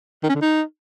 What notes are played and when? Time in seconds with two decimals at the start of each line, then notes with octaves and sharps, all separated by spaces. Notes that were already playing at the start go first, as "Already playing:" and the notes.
0.23 D#3
0.29 C#4
0.35 D3
0.41 D#4